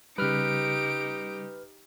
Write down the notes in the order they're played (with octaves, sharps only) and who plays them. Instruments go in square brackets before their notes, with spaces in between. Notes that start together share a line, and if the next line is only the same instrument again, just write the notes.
[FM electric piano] C#3 G3 [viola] D#4 G4 [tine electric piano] B4 F6 [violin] D7